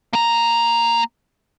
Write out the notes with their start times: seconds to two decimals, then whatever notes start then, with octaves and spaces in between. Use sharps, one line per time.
0.13 A#3 A#5